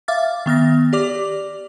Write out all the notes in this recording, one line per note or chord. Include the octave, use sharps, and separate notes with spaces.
E5 F5 D6 F6 A6
D#3 B3 F6 A#6
G4 D5 D6 F7